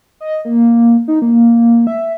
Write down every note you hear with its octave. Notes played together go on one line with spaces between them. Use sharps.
D#5
A#3
D#4
A#3
E5